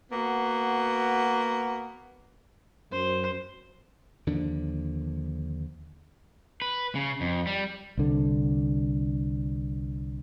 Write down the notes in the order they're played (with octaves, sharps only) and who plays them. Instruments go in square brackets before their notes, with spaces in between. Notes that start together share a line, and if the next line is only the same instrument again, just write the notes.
[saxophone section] A#3 B3 F#4
[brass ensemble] F#2 [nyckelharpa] C5
[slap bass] D#2 D3 F3 D4
[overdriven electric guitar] B4
C#3
F2
G3
[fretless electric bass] C2 D3